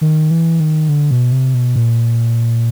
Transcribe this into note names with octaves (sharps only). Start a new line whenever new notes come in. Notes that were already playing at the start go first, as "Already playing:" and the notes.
D#3
E3
D#3
D3
B2
C3
B2
A#2